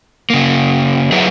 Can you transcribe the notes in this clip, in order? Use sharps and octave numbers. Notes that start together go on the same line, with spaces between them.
C#3 A#3
F#3 E4 G#4 B4 E5 A#5